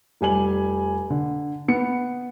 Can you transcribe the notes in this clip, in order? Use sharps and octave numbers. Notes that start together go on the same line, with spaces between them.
F1 G3 G#5 F#7
D3
B3 C#7